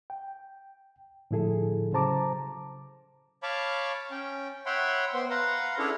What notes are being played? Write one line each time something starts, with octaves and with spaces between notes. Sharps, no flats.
G5
A2 D3 F3 E4 G#4 A4
C#3 F#3 C5 A5 A#5 D6
C#5 F5 A5 B5 C#6 D6
C#4 G5
C#5 E5 F#5 G5 B5 C6
B3 C5 C6
B4 F5 F#5 A#5 C6
C#4 D4 E4 G#4 A4 C#5